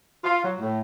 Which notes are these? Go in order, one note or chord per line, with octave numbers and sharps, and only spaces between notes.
F4
F#3
A2